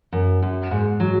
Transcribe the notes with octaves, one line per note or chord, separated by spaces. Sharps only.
F#2
F#2
G#2
F#3